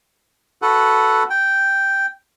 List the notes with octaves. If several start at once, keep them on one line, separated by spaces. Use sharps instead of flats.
F#4 A4 B4 F#5
G5